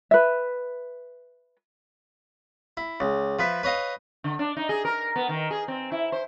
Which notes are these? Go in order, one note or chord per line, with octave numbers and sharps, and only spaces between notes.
B4 E5
E4
C#2
F3 B4 E5
B4 C#5 D#5 F5
D3
D4
D#4
G#4
A#4
B3
D#3
G#4
C4
E4
C5